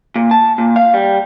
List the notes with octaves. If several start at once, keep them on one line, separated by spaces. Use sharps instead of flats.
A#2
A5
A#2
F5
G3